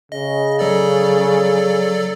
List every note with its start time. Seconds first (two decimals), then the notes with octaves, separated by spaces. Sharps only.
0.12 C#3 D#5
0.59 F#3 A4 D5